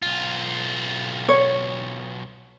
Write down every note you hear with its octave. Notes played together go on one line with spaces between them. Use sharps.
B1 F4
C#5